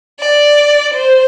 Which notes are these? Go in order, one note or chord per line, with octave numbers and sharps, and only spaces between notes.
D5
C5